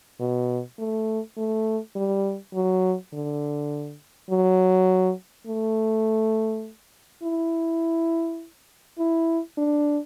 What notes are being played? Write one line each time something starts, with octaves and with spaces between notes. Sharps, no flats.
B2
A3
A3
G3
F#3
D3
F#3
A3
E4
E4
D4